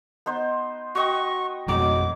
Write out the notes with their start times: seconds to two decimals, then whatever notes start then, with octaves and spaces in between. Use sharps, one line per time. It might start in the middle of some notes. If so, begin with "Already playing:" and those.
0.26 B3 D#4 C5
0.95 F#4 D#5 G5 C#6
1.68 F2 B2 F#3 G#3 D#4 D6